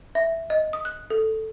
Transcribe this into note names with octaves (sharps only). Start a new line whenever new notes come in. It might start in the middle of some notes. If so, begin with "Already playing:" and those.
E5
D#5
D#6
F#6
A4